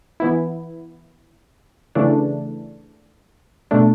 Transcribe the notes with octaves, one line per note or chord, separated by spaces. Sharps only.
E3 B3 E4
C#3 E3 A3 D4
B2 A3 D4